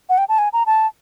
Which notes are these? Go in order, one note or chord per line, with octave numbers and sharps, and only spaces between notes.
F#5
G5
A5
G#5
A#5
A5